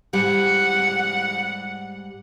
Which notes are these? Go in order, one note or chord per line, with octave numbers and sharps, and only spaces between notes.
G#2 G3 F#5